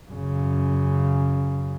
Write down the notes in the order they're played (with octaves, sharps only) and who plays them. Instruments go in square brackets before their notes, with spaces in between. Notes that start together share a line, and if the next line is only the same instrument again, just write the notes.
[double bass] F#2 C#3